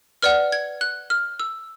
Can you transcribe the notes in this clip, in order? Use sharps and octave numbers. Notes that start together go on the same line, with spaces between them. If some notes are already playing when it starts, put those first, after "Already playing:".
B4 D5 F#5 F6
G#6
F#6
F6
E6